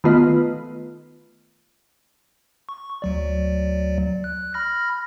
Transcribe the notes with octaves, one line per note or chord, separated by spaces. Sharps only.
D#3 A3 B3 F4 B4 D#5
C#6
D2 F#3 D5
F#6
B5 F6 A#6